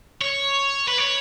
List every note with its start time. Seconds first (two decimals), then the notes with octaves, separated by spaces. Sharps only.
0.21 C#5
0.88 B4
0.98 C#5